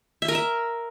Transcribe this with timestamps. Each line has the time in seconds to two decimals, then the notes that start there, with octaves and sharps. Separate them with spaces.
0.22 E5
0.28 A#4
0.35 E5